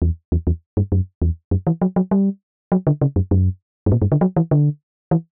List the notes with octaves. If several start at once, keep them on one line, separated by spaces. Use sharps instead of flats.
E2
E2
E2
G2
F#2
E2
F#2
E3
F#3
F#3
G3
F#3
D3
C#3
F#2
F#2
G2
A#2
G2
D3
F#3
E3
D3
E3